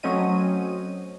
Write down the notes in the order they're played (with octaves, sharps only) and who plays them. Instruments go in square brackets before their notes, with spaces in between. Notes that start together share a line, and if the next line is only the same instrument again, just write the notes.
[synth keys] F#3 A3 C4 C#4 D#5 D#7